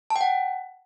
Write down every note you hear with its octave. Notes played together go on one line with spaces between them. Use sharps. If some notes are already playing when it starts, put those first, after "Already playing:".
A5
G5
F#5